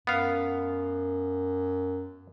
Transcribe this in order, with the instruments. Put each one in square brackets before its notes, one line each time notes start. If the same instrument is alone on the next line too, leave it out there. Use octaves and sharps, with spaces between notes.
[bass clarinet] F#2 [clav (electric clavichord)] B3 F5